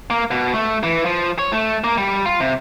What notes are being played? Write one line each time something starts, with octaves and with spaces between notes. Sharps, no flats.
A#3
B2
A3
E3
F3
C#5
A3
A#3
G3
F4
C3